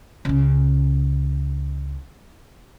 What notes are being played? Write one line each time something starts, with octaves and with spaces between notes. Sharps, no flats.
C#2 C#3